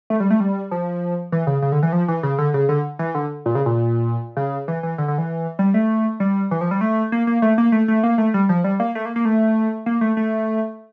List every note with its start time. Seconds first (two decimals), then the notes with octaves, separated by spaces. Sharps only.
0.10 A3
0.20 G3
0.30 A3
0.40 G3
0.71 F3
1.32 E3
1.47 C#3
1.62 C#3
1.72 D3
1.83 E3
1.92 F3
2.08 E3
2.23 C#3
2.38 D3
2.54 C#3
2.69 D3
2.99 E3
3.15 D3
3.46 A#2
3.55 C#3
3.66 A#2
4.37 C#3
4.68 E3
4.83 E3
4.98 D3
5.08 D3
5.18 E3
5.59 G3
5.74 A3
6.20 G3
6.51 E3
6.61 F3
6.71 G3
6.81 A3
7.12 A#3
7.27 A#3
7.42 A3
7.58 A#3
7.72 A3
7.88 A3
8.03 A#3
8.18 A3
8.34 G3
8.49 F3
8.64 G3
8.80 A#3
8.95 A3
9.05 A#3
9.16 A#3
9.25 A3
9.86 A#3
10.01 A3
10.17 A3